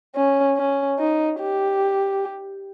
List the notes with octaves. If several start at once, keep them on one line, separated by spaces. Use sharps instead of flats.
C#4
C#4
D#4
G4